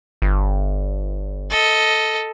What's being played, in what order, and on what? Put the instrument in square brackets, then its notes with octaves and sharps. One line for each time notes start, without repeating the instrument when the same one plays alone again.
[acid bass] G1
[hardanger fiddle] A4 D#5